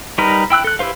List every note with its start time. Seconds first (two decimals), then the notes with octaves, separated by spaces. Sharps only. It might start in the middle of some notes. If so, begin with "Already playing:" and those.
0.18 G3 D#4 A#4 B4
0.50 E4 G5 E6 F#6
0.64 A4 F#6
0.79 E4 G4 B4 C5 F5